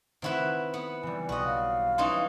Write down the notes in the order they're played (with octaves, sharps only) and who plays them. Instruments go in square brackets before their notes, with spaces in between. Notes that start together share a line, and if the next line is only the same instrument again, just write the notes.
[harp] D#3 F#5 C#6 [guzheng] C4 E4 B4
[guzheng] B3
[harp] E3 G3 [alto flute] G#5
[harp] B1 [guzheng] F#4 D#5
[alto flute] F5
[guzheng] E3 C#4 D#4 [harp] C6